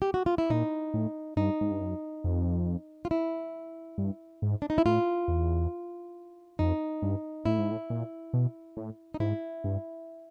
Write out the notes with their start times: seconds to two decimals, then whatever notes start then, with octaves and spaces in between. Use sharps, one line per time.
0.02 G4
0.14 F#4
0.26 F4
0.38 E4
0.50 A#2 D#4
0.94 A2
1.37 G2 D#4
1.61 G#2
1.71 G2
1.81 F#2
2.24 F2
3.05 F4
3.11 E4
3.98 G2
4.42 G#2
4.62 D4
4.70 D#4
4.78 E4
4.86 A2 F4
5.28 E2
6.59 F2 D#4
7.02 G2
7.46 A2 E4
7.58 G#2
7.71 A2
7.90 A#2
8.33 B2
8.77 A2
9.14 D#4
9.20 G#2 E4
9.64 G2